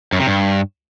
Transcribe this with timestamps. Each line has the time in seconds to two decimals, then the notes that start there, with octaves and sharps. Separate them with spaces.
0.13 F#2
0.20 C3
0.27 G2